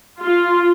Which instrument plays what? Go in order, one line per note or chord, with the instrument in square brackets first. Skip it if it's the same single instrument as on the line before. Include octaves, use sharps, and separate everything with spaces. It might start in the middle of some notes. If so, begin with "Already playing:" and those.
[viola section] F4